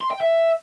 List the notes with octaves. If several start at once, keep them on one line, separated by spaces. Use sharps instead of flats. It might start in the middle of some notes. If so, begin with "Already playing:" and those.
C6
G5
E5